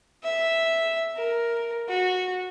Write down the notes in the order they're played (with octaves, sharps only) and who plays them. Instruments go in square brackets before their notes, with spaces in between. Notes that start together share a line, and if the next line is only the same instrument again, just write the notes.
[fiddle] E5
A#4
F#4